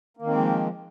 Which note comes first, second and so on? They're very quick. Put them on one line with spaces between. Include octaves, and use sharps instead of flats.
A#3 D#3 C4 G#3 F3